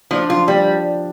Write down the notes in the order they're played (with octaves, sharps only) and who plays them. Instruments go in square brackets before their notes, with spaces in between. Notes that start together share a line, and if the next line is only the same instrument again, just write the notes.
[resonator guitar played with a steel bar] F3 [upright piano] D4
[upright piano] F3 [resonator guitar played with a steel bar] F4
[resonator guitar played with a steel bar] G3 [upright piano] D4